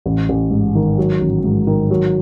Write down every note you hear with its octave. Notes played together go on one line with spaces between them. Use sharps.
A1
A1
G#2
D#3
F#3
A1
G#2
D#3
F#3